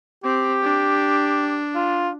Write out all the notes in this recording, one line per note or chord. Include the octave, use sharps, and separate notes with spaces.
C4 G4
D4
F4